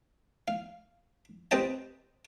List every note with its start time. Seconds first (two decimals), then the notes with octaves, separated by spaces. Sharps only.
0.48 F5
1.51 C4 G4 B4 D#5 G5 A5